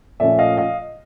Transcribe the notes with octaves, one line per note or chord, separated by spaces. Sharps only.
A#2 F3 A3 C#4 D5 E5
D#5 F5
D#5 F5